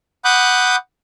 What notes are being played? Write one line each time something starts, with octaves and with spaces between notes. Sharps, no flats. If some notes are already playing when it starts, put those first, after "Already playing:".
F#5 B5 D6 D#6 F#6 G6